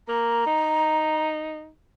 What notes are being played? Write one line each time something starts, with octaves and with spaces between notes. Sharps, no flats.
A#3 A#5
D#4